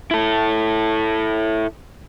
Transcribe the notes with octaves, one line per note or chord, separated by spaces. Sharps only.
E4 A4